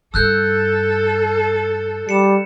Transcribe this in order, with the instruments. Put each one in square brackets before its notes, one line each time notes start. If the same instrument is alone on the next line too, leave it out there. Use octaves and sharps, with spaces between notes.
[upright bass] G2 [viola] A4 [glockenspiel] E6 F#6 G6
[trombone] G3 [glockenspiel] C#7 E7